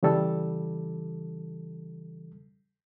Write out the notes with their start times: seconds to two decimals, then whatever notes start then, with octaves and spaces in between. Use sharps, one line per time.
0.03 C#3 E3 G3 A4